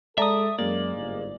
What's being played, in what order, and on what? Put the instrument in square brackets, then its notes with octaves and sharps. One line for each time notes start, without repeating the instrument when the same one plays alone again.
[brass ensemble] G#3 A4 [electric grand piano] D5 A5 A#5 [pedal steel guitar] E5 D#6
[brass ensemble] F#2 [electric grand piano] G#3 A#3 [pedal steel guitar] D5
[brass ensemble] G1 G#2